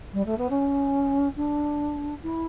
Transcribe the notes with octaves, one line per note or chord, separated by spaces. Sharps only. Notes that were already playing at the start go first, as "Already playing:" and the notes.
G3
A3
B3
C#4
D4
E4